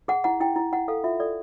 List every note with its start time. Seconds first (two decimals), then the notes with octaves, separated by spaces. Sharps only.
0.08 G#4 F#5
0.24 E4 F#5
0.40 E4 G5
0.56 E4
0.73 E4 F#5
0.88 A4 F5
1.04 F4 E5
1.20 A4 D5